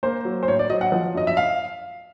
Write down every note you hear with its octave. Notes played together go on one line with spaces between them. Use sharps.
A#3 C5
F#3
C5
A2 C#5
D5
F#3 D#5
F#5
F3
F#2 D#5
E5
F5